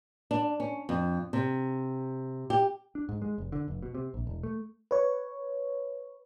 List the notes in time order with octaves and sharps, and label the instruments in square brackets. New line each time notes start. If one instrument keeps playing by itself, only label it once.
[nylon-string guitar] D4
C#4
F2
C3
G4
[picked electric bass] D4
G#2
G#3
F1
D3
F1
B2
C3
A#1
E1
A3
[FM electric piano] B4 C#5